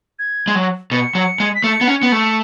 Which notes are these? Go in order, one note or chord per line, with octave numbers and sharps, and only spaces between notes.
G#6
G#3
F#3
B2 C#7
F#3
G#3
B6
A3 C#7
B3
C#4
B3 C#7
A3